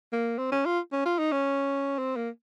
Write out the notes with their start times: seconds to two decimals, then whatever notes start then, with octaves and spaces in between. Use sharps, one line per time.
0.13 A#3
0.38 C4
0.52 C#4
0.65 F4
0.92 C#4
1.05 F4
1.18 D#4
1.32 C#4
1.98 C4
2.16 A#3